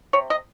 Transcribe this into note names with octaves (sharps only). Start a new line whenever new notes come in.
C3 C#5
D#5